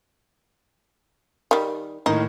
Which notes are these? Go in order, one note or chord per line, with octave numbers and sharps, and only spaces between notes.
D#3 G3
A2 D#3 A#3 D#4